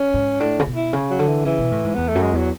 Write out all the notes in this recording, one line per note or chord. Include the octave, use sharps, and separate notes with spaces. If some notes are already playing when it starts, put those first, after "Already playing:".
Already playing: C#4
G#2
A2 D4
C#3
B2
E4
C#3
F#3
D3
E3
C#3 E3
B2
A2
G#2
E2 B3
A3
F#2
G#3
E2 F#3